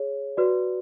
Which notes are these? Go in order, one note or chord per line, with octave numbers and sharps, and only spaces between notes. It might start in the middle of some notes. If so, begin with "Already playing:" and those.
Already playing: G#4 C#5
F#4 B4 D5